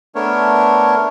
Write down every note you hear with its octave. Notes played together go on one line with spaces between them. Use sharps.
A3 B3 D4 A#4 C#5